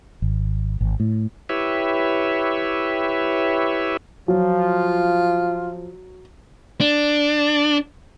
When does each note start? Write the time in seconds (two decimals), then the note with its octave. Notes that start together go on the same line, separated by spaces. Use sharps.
0.22 G#1
0.81 G#1
1.00 A2
1.49 E4 G4 B4 C#5 E5
4.28 F3 F#3 F4
6.81 D4